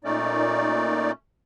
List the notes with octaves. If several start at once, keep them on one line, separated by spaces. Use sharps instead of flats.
A#2 A3 C#4 D#4 D5